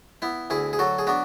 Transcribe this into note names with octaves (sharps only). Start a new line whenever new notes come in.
B3 E4
D2 E4 G#4
G#4
F#3 F#4 A4
G#4
B3 D4 F#4